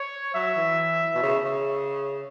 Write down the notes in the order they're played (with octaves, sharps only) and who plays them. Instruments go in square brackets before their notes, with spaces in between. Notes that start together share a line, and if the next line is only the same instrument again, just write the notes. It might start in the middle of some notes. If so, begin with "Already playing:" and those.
Already playing: [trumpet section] C#5
[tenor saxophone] F#3 [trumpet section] E5
[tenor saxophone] E3
B2
C#3
C#3